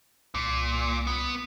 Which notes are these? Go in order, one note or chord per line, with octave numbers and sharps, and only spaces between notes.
C2 A#2
B3